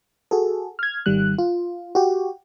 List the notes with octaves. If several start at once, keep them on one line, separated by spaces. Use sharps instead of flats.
F#4 G#4 A4
F6 G#6
G#1 D#3 G3 F#6
F4
F#4 G4